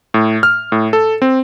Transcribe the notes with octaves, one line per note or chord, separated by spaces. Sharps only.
A2
F6
A2
A4
C4